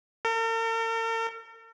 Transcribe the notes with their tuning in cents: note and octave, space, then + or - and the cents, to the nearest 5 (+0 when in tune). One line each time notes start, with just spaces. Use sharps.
A#4 -45